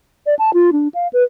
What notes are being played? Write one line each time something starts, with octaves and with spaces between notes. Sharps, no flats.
D5
A5
F4
D4
F5
B4